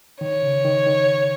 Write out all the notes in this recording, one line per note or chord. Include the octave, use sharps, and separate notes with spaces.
D#3 C#5
C#3
D#3
D#3